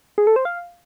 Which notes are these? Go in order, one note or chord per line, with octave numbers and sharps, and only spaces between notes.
G#4
A4
C5
F5